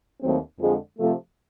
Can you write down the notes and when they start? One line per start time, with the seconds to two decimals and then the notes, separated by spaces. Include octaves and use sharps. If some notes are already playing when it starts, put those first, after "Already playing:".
0.22 D#2 D#3 F#3 A3 C4
0.60 F2 D3 F3 G#3
0.99 C3 F3 A3